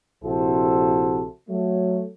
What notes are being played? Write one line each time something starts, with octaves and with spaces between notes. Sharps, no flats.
A#1 C3 E4 F#4 A4 C5
F#3 A3